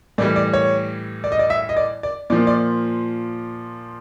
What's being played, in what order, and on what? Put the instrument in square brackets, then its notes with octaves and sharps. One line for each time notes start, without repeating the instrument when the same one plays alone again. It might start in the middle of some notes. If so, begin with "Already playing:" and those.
[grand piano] A2 E3 G3 D5
D5
C#5
D5
D#5
D5
E5
D#5
D5
D5
A#2 F3 D5
D5